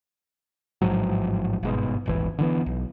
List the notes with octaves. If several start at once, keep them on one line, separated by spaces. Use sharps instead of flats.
A1 G#2 F3 F#3
G1 G#2 B2
D#1 G#1 E3
D3 E3 B3
B1